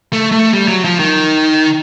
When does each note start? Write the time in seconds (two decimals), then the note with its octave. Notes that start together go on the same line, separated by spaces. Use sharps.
0.13 A3
0.32 A3
0.54 G3
0.68 F#3
0.85 F3
0.99 D#3